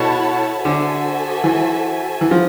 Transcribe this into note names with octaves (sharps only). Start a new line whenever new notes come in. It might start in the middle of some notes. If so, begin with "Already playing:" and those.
Already playing: B2 E4 A4 C#5 F#5 A5
D3 F#4 A4 C5 E5 G#5
E3
E3
F3